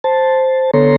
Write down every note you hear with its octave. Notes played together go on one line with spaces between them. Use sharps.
C5 A5
D3 B3 A4 C#5 A#5 C6